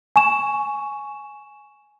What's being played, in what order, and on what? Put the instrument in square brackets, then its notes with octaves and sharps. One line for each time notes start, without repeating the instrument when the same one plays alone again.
[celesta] G#5 C#6 E7